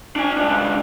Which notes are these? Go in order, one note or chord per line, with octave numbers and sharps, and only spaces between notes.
D4 G#5
C#2 D4